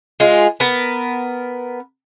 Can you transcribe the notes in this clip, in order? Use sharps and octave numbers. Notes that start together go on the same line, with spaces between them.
G#3 F4
B3 A#4